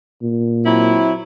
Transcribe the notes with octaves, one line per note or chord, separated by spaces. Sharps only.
A#2
F#3 C4 E4